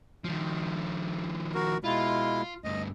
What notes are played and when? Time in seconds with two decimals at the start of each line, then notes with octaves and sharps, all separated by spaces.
0.24 D#3 F3
1.54 F#4 A#4
1.84 B2 G#3 E4 F4
2.64 D2 G2 D#5